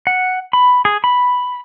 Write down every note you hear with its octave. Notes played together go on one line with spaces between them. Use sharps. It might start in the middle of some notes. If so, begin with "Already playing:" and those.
F#5
B5
G#4
B5